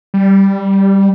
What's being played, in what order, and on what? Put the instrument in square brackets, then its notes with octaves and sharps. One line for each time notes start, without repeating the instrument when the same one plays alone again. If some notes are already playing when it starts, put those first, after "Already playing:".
[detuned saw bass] G3